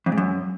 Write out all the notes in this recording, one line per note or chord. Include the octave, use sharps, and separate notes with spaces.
F2
G#2
F#2